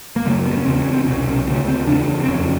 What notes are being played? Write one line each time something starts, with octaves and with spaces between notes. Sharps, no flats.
A#3
F#2 C#3 A3
B3
C#4
E2 C#3 C4
C#4
C4
C2 B2 C#4
D2 C#3
C4
E2 C#3 D4
C4
F2 C#3 C#4